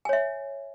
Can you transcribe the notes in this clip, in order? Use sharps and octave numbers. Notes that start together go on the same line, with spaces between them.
C#5 E5 G#5